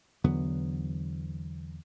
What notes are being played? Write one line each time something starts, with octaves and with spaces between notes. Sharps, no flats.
E2 D3 F#3 B3